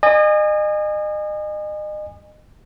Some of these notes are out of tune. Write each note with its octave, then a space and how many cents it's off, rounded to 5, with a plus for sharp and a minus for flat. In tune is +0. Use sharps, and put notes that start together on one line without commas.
D#5 -35 G#5 -20